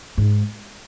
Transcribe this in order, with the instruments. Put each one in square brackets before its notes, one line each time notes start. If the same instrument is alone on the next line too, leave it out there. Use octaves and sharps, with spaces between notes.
[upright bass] G#2